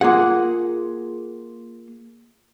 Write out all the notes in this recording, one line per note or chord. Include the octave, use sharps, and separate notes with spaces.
A#3 F4 G#4 F#5